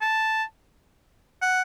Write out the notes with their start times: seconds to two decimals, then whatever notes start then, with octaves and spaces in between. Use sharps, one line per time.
0.01 A5
1.42 F#5